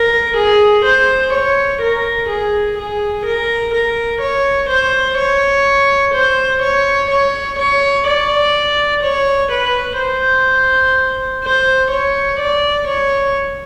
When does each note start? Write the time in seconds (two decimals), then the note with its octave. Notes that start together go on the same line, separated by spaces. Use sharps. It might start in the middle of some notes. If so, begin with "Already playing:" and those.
Already playing: A#4
0.37 G#4
0.85 C5
1.34 C#5
1.82 A#4
2.30 G#4
2.78 G#4
3.26 A#4
3.74 A#4
4.22 C#5
4.70 C5
5.18 C#5
6.14 C5
6.63 C#5
7.11 C#5
7.59 C#5
8.07 D5
9.03 C#5
9.52 B4
10.00 C5
11.44 C5
11.91 C#5
12.40 D5
12.88 C#5